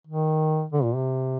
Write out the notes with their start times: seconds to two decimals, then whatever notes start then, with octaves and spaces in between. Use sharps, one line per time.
0.07 D#3
0.73 D3
0.84 A#2
0.95 C3